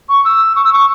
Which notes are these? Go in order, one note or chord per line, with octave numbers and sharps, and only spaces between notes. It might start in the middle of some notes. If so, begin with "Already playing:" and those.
C#6
E6
C#6
E6
C#6